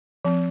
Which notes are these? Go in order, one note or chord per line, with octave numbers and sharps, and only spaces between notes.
F3 C4